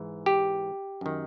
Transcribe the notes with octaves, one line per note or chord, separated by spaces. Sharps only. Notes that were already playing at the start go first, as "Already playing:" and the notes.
Already playing: G#2 E3
G4
F#2 D#3